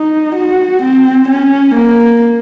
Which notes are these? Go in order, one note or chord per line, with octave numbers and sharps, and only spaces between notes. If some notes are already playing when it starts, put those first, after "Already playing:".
Already playing: D#4
F#4
C4
C#4
A#3